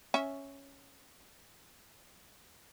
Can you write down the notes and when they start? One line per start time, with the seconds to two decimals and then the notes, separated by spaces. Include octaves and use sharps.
0.14 C#4 E5